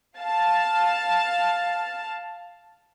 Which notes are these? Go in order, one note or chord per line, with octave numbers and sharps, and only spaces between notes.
F5 A5